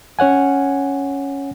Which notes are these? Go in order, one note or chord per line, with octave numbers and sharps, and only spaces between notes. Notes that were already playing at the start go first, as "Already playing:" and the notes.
C#4 C#5 F#5 G#5